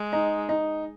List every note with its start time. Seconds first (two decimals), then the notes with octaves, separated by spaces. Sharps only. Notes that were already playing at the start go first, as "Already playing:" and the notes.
Already playing: G#3
0.13 D#4
0.49 D#4